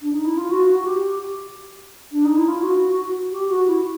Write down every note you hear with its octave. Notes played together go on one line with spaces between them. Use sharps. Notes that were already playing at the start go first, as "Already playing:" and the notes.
D4
D#4
E4
F4
F#4
G4
D4
D#4
E4
F4
F#4
G4
F#4
E4